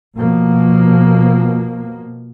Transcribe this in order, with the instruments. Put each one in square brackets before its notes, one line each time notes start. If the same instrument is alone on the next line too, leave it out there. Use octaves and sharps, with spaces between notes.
[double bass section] B2 F3 A#3